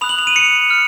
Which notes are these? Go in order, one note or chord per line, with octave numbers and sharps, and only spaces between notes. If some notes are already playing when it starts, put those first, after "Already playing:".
B5 D#6 F#6 F7
F#7
F7
D#7
C#7
F6